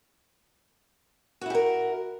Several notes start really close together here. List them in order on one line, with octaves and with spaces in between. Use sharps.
F#4 E4 G4 A#4